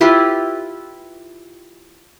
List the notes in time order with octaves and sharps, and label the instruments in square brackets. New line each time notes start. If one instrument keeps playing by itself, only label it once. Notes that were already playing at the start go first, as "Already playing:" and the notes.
[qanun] E4 F4 G4 B4